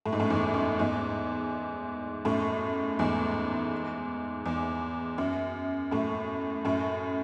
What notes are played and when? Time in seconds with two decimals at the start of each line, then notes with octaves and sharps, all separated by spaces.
0.06 A2
0.13 G#2
0.20 F#2 A2
0.30 E2 G#2
0.54 F#2
0.79 E2 G#2
2.25 F#2 A2
2.99 E2 G#2
4.46 E2
5.18 F#2
5.91 F#2 A2
6.65 F#2 A2